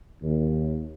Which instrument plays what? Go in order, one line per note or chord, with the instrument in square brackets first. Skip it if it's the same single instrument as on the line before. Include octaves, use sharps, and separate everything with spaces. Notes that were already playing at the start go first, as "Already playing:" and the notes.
[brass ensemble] D#2